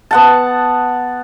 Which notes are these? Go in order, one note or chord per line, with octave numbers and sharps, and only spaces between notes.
B3 F#5 A5